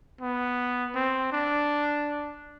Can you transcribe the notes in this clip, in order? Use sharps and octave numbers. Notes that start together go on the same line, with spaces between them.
B3
C4
D4